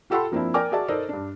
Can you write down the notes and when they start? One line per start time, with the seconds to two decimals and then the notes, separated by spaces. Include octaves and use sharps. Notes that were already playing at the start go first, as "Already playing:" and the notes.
0.10 F4 G4 A4 F#5 B5 C6
0.32 F3 A#3 C4 D4 E4
0.54 A#4 D5 G5 G#5 D6 F6
0.72 F#4 G#4 D5 E5 A5
0.88 D#4 A4 A#4 C5 D5 D#5
1.09 G2 D4